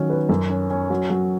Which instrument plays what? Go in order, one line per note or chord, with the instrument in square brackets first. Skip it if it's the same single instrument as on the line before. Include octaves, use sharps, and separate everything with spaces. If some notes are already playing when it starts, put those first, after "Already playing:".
Already playing: [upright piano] D#3 F#3 C#4
B4
F#2
C#4
C#4
F#3
F#3